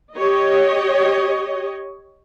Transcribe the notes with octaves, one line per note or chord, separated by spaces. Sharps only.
G4 C#5 D#5